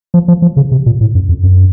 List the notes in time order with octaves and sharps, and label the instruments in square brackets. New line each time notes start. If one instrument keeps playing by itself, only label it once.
[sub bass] F3
F3
F3
C#3
C3
A#2
A2
F#2
F2
F#2